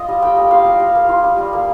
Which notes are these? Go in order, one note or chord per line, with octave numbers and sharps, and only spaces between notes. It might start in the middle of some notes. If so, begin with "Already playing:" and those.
Already playing: F4 D#5
G3
G3 G5
A#3
F4 F5
G3
G3
A#3
F4
G3
G3
A#3